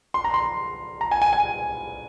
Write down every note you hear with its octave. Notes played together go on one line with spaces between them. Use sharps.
C6
A#5
C6
A#5
G#5
G#5
G#5